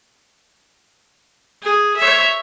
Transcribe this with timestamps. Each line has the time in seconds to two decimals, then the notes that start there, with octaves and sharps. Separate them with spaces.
1.63 G#4
1.97 C#5 E5